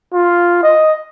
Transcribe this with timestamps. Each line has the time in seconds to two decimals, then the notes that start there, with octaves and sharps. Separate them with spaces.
0.13 F4
0.63 D#5